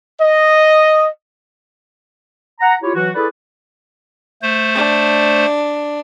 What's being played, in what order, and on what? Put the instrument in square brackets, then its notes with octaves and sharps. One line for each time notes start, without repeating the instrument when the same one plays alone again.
[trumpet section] D#5
[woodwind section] F#5 A#5
E4 F4 G4 C#5
E3 F#3 F#4
E4 G#4 A4 B4 D5
[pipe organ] A3 C5
[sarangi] D4